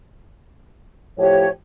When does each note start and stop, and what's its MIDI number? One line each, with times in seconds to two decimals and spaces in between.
1.18 1.46 45
1.18 1.46 53
1.18 1.46 67
1.18 1.49 73